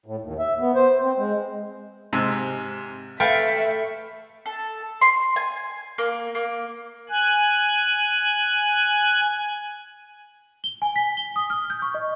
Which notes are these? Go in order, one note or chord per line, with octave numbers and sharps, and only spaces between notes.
A2
D#2
E5
B3
C5
C4
G#3
G#2 C3
A3 B4 E5 F5 G5
A4
C6
G#5
A#3
A#3
G#5 F#6
G7
G#5
B6
G7
D#6
F6
G6
C#6
D#5